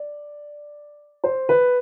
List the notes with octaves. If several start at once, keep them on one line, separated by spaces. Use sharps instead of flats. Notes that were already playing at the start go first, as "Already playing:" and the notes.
Already playing: D5
C5
B4